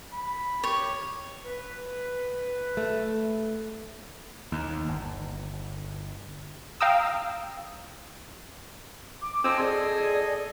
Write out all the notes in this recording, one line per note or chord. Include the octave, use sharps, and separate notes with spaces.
B5
G4 C#5
B4
A3
D#2
G1
F5 G5 A#5 D#6 E6
D6
C4 A4 D#5 G#5 C6
G#4 D5